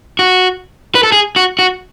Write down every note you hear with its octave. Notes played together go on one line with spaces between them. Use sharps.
F#4
B4
A4
G#4
F#4
F#4